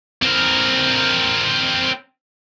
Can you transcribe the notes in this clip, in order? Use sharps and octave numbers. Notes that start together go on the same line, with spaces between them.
C4 A#4